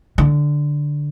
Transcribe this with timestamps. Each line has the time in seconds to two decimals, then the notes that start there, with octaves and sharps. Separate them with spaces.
0.18 D3